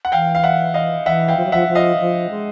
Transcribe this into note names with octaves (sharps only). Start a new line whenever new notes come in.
F#5
E3 F5 G5
F5
E5 F#5
D#5 F5
E3 E5 F#5
F5 G5
F3
F#3
F3 E5 F#5
F3
D#5 F5
E3
F3
G#3